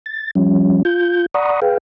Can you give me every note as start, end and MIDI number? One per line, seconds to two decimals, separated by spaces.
0.06 0.31 93
0.35 0.83 53
0.35 0.83 55
0.35 0.83 61
0.85 1.26 65
0.85 1.26 91
1.34 1.60 74
1.34 1.60 78
1.34 1.60 82
1.34 1.60 83
1.34 1.60 85
1.34 1.60 87
1.62 1.78 68
1.62 1.78 71
1.62 1.78 77
1.62 1.78 79